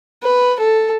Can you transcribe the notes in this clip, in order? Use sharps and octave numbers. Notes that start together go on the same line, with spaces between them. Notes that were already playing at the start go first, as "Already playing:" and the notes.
B4
A4